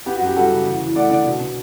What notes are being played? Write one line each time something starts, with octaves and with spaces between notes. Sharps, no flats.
B3 G4
F#4
F#2
G4
G3 F#4 A4
C#3
E2
E2
A3 D5 F#5
D3 D5 F#5
B2
B2